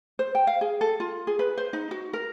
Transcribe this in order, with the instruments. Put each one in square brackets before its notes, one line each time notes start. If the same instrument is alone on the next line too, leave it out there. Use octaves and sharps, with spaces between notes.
[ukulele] C5
G5
F5
G#4
A4
F4
G#4
B4
C5
D#4
F#4
A#4